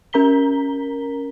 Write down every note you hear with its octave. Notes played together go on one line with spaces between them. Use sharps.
C#4 A#4 A#5 B6 G7